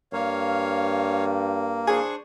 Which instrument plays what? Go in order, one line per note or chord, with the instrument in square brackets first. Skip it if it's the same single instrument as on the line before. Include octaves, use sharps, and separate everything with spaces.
[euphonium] G2 [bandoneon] A#3 [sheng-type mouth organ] C#5 F5
[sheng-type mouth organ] D4 C5 C#6 [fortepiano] G#4